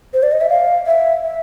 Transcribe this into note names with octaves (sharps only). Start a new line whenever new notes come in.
C5
D5
D#5
E5
F5
E5
E5